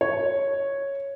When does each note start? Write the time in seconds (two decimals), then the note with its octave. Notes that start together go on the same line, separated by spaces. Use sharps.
0.01 C#5